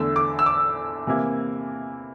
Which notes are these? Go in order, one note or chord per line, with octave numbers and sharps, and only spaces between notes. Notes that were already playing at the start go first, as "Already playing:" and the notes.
Already playing: E2 D3 A3 E4 E6
D6
E6
D6
C3 E3 A#3 E4